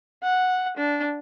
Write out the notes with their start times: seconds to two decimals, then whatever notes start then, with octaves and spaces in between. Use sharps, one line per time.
0.23 F#5
0.77 D4